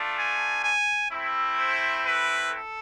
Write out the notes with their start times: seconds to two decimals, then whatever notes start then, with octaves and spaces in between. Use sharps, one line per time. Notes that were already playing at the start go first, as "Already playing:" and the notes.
Already playing: A3 D4 F4
0.18 G#5
0.63 G#5
1.10 A3 C4 E4
1.57 C5
2.04 B4
2.50 A4